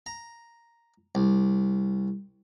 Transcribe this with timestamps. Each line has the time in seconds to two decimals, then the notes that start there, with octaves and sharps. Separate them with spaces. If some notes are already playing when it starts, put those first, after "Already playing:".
0.06 A#5
1.15 C2